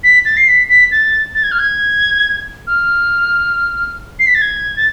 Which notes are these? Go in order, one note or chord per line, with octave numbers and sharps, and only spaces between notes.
B6
A6
C7
B6
B6
A6
A6
G#6
F6
G#6
F6
C7
B6
A6
G#6
A6